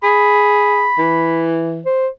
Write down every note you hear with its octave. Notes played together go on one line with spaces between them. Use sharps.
G#4 B5
E3
C5